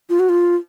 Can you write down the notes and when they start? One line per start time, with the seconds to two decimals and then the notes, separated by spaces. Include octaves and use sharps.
0.09 F4
0.19 F#4
0.29 F4